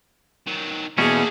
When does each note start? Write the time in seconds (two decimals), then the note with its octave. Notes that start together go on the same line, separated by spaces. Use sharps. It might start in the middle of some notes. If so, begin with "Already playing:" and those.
0.47 D#3 F#3
0.98 E2 B2 A3 A#3 C#4 F#4 G#4